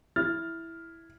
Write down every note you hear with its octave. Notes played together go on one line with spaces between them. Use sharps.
E4 F6 A6